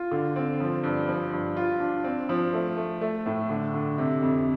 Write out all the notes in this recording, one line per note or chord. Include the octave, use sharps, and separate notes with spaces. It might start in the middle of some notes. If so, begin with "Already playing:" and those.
Already playing: F4
D3
C4
F3
G2
F3
G2
F4
D4
C4
F3
A3
A3
A3
A2
D3
D3
C3
F2